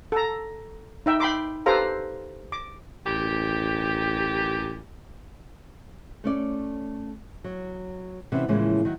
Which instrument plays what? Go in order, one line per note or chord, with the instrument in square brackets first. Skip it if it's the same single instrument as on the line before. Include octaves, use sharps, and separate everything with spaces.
[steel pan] A4 A#5
D#4 E5 G5
G5 B5 C6 D6
G4 A4 B4 C5 F5 A#5
D6
[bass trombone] A1 [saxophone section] A#2 G4
[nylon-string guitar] A3 C#4 D5
F#3
C3 E3 B3 C#4
A2 C#3 E3 F3 G#3 A#3
D#3 F#3